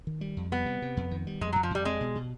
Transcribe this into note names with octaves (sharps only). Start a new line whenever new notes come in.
D#3
G3
F2
G3 B3
C3
C3
F2
D#3
G3
F2 G#3
F#3
F2
F3
F2 G3
G#3 C4
B2
B2